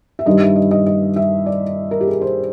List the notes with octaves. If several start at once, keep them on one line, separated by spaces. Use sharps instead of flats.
E5
G2 D#3 G3 D#5
E5
D#5
D#5
D#5
E5
D5
A#4
G4
G#4
C5